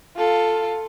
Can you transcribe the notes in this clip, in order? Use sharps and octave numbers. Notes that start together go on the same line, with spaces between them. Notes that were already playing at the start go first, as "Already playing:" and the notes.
F4 A4